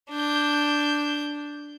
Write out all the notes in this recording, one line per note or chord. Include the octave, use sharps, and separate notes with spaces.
D4 G6